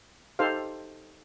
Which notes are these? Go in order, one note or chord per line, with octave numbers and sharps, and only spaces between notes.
D#4 G4 A4 C5 F5